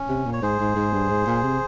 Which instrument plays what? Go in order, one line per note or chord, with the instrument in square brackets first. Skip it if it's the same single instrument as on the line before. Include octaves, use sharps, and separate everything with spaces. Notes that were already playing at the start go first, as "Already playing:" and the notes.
Already playing: [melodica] C#4
[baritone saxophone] C3
A#2
[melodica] C#5
[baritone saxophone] G#2 [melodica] G#4 C5
[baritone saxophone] G#2
G#2
G2
G#2
A#2
C3